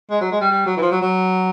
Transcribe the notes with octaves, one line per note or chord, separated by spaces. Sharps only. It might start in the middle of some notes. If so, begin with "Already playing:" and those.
G#3
F#3
G#3
G3
G3
F#3
E3
F3
F#3
F#3